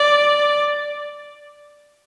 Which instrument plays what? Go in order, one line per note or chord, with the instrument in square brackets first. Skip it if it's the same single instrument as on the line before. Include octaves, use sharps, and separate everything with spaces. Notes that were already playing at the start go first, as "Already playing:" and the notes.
Already playing: [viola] D5